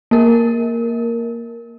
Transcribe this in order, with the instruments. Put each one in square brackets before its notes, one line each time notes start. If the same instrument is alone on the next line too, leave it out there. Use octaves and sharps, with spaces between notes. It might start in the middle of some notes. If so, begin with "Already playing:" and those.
[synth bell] A#3 A#4